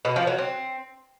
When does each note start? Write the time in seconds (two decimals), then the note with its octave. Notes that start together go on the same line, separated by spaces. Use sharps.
0.05 B2
0.16 F3
0.27 F#3
0.38 C4